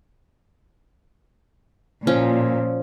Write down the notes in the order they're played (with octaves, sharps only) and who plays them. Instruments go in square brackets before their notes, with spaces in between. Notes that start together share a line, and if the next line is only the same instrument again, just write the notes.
[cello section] A#2 [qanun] F3 C#4